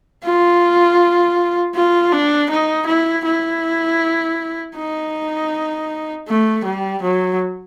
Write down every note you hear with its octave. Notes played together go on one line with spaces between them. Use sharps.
F4
F4
D4
D#4
E4
E4
D#4
A3
G3
F#3